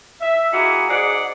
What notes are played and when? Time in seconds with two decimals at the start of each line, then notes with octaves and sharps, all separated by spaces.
0.21 E5
0.52 A#3 D#4 E4 F#4 G#4
0.89 G#2 G#4 D5 F#5